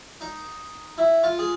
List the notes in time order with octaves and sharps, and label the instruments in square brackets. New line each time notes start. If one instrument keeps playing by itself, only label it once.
[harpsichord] D#4
E4
F4
G#4